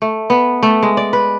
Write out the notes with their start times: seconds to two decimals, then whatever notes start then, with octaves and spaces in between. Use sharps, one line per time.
0.02 A3
0.30 B3
0.63 A3
0.83 G#3
0.97 D5
1.13 B4